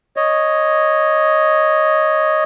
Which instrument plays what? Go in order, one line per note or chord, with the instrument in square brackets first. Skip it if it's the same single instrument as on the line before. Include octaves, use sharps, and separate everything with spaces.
[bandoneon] C#5 D#5